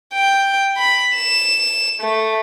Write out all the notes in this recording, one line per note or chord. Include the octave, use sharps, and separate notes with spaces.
G5
B5
E7
A3